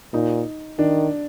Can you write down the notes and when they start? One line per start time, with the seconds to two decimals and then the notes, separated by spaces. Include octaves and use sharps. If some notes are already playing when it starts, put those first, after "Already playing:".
0.13 A#2 D#4
0.79 D#3 D4